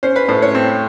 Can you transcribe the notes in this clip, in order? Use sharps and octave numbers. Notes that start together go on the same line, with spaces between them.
C#4 C5
B4
A2 C5
C#5
C4